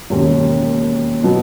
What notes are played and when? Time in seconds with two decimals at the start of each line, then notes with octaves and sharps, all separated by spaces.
0.10 E1 D#2 C#3
1.23 B2 F#3 B3